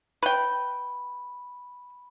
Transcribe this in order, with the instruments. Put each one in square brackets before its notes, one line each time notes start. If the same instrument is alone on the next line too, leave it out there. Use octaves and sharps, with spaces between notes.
[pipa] B4 G5 [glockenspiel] B5